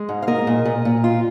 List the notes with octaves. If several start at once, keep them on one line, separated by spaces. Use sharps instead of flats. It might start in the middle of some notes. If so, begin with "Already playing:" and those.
Already playing: G#3
G#2
F5
A#3 A#4 D#5
A#2
A#2
A#2
F4